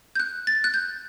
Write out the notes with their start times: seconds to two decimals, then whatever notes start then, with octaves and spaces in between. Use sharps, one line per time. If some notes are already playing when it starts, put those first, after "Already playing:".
0.15 G6
0.20 F#6
0.47 A6
0.64 F#6
0.74 G6